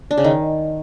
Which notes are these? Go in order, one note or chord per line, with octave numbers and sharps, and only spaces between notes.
D4
C#3
D#3